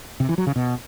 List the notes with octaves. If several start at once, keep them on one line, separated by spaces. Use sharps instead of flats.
C3
E3
F#3
C#3
B2